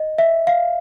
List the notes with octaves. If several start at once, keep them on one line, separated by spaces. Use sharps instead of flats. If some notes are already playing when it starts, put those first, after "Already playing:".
Already playing: D#5
E5
F5